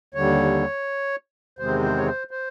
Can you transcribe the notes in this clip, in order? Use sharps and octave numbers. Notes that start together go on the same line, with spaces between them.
D#2 D3 G3 C#5
E2 C3 D#3 G#3 C4 C5
C5
C#5
C5
C5